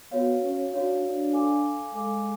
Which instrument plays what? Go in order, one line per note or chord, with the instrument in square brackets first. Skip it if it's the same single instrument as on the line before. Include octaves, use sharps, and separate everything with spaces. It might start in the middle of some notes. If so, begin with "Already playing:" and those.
[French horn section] B3 [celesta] F#4 C#5 F5
[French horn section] C#4
[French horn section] D4 [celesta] F#4 C#5 F5
[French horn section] D4
[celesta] A4 F5 G#5 D6
[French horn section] G#3 [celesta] A4 F5 G#5 D6